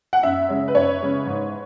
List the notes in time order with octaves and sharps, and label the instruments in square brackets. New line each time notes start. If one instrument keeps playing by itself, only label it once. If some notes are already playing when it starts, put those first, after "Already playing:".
[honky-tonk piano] F#5
[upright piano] F#2 [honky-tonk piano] E5
[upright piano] C#3 G#3 C#4
[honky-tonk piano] B4
[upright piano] F#2 [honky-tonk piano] C#5
[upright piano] C#3 G#3 C#4
G#2